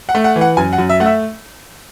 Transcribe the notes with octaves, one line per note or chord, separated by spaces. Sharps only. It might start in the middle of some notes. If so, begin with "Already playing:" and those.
F#5
A3
F#5
E3
F#5
F#2 G#5
F#5
F#2
E5
A3 F#5
E5